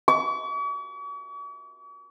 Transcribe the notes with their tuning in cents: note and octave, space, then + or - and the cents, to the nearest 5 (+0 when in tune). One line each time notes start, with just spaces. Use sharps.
C#6 +45